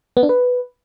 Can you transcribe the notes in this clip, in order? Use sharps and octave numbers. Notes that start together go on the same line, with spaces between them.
B3
D4
B4